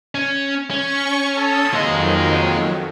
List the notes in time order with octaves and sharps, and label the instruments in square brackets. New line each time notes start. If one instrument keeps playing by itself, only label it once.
[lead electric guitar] C#4
[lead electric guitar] C#4 [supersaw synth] C#6
[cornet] A4 [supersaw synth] D#6 E6
[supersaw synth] F2 D#3 F#3 [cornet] G#3 [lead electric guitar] A#3 D#5